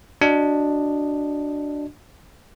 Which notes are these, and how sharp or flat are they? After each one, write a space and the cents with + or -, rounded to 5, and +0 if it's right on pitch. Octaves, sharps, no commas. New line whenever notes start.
D4 +0 F#4 +0 D#5 -10